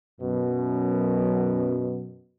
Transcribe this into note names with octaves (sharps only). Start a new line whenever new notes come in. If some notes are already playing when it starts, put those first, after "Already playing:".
F#2 B2